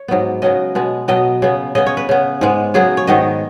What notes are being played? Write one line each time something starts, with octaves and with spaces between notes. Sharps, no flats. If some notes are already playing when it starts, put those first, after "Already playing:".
Already playing: C#5
G#2 F#3 B3
C#3 F#3 B3 D#5
B2 G#3 B3
B2 F#3 B3 D#5
C#3 B3
C#3 B3 D#5
C#5
B4
C#3 B3
G#2 G#3 B3
C#3 F#3 B3 G#4
C#5
G#2 D#3 B3 D#5